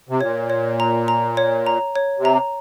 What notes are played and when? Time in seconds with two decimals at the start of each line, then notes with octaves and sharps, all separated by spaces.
0.09 C3
0.21 A#2 C#5
0.50 C#5
0.80 A#5
1.08 A#5
1.37 C#5
1.66 A#5
1.96 C#5
2.18 C3
2.25 A#5